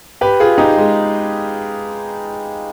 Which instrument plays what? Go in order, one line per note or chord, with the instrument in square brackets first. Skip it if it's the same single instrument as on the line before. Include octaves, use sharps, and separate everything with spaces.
[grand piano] G4 B4
F4 G#4
D#4 G4
G#3